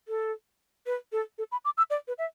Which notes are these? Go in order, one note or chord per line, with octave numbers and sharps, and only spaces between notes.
A4
B4
A4
A4
B5
D6
E6
D5
B4
E5